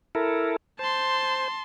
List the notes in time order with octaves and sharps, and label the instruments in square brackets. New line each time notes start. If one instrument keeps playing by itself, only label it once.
[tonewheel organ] E4 A4 A#4
[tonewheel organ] C5 [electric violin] A5 C6